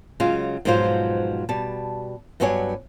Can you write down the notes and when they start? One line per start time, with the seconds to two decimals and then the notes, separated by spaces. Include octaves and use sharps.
0.20 C#3 F#3 G#3 F4
0.65 G#2 B2 F3 F#3 F4 C5
1.49 B2 G3 A5
2.40 G2 F#3 B3 D4 C#5 G#5